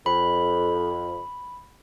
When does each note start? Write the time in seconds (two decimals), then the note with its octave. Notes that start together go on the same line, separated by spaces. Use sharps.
0.06 F2 B5